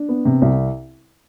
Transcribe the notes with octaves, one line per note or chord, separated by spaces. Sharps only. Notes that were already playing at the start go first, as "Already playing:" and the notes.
Already playing: D4
B3
C3
C2